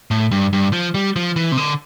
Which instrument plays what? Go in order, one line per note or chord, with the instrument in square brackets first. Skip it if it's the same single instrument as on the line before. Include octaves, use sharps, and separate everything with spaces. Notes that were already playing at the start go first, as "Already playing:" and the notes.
[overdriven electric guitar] A2
G2
G2
F3
G3
F3
E3
C3
D3